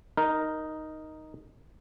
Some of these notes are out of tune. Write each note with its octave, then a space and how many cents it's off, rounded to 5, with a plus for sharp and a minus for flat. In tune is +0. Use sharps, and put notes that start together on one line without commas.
D#4 +0 A#4 +0